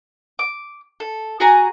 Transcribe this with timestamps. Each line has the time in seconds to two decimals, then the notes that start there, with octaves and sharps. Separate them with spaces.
0.39 D6
1.00 A4
1.40 F#4 G#4 G#5 A#5